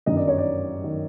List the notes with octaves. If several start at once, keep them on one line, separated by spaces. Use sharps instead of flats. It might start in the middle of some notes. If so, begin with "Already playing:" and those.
G1 F#2 D#3 D#5
D5
C#5
D5
D#3